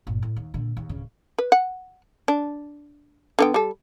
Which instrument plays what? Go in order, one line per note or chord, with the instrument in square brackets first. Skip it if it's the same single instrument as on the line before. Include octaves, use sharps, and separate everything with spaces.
[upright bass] G1 A#2
A2
D#2
A#2 D3
D#2
D1 C#3
[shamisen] B4
F#5
D4
D3 B3 G5
G3 A4